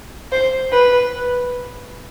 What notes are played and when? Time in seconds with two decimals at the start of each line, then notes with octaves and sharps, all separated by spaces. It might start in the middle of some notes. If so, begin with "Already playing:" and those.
0.32 C5
0.72 B4